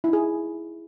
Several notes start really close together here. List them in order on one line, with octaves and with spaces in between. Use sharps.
E4 D#4 G#4